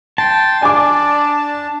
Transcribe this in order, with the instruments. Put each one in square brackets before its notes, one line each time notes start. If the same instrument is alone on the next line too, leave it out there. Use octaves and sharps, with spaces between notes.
[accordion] G5 C6 [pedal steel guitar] A5
[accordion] D4 [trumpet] D5 [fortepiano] G#5 D6